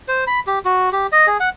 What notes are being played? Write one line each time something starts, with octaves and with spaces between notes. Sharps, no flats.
C5
B5
G4
F#4
G4
D#5
G#4
F#5